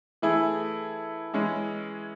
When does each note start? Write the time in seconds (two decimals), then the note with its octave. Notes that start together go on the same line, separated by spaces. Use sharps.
0.22 E3 A3 E4 G#4
1.34 E3 G#3 C#4 E4 G#4